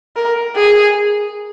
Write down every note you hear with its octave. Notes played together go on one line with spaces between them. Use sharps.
A#4
G#4